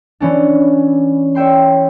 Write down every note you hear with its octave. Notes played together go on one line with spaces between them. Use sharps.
E3 C#4 D4
C#5 E5 G5 C6